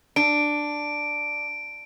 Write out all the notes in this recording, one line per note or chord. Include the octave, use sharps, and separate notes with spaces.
D4 D7